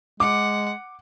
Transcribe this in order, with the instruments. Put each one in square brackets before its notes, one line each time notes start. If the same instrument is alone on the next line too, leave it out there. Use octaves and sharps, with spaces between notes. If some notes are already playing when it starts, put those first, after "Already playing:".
[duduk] G#3 [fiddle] F#5 [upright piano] D6